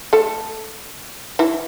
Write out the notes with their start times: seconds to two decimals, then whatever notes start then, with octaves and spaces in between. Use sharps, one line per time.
0.13 A3 A4
1.39 E3 E4